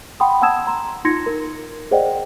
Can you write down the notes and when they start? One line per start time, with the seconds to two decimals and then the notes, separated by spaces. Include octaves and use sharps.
0.20 F#5 G5 B5 C6 D#6
0.42 F#5 A5 D#6 E6 G#6 E7
0.67 A#5 C6
1.05 D#4 F4 C6 G#6 A#6 C#7
1.26 A#4
1.91 G#4 C5 D5 D#5 F#5 G5